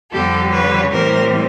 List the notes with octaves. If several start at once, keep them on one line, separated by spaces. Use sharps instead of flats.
F2 D3 G3 G4 A4
B4 C#5
A2 E3 G3 C4 A#4 C5